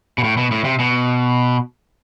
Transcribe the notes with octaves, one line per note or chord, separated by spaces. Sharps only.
B2
A2
B2
A2
C3
B2